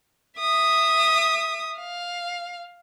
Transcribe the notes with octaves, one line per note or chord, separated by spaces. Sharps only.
E5 D#6
F5